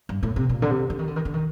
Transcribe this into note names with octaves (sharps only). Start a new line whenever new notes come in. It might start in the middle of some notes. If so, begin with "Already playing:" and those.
G2
A2
C3
A#2
D3
C3
D3
D#3
D3
D#3
D3
D#3